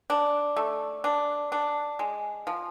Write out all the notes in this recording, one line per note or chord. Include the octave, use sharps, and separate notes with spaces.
D4
A3
D4
D4
G#3
F3